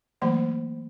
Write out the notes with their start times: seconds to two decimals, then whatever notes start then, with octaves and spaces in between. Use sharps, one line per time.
0.22 E3 F#3 A3 A#3 C5 B5